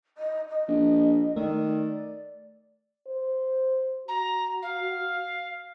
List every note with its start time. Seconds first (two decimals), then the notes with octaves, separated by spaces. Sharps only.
0.18 D#5
0.49 D#5
0.68 A#1
1.36 D#3 A3 D5
3.07 C5
4.08 F#4 A#5
4.62 F5